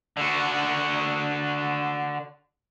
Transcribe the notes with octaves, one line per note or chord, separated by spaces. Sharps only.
D3 F#4